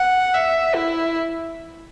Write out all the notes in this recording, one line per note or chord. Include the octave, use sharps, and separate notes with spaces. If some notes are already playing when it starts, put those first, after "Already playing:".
Already playing: F#5
E5
E4